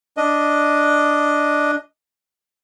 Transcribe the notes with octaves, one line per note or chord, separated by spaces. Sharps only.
D4 D#5